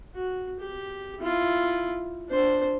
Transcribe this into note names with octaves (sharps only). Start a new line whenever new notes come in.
F#4
G4
E4 F4
D4 C5